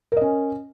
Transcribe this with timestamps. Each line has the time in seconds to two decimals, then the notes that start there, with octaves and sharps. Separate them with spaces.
0.12 A#4
0.17 D#5
0.21 C#4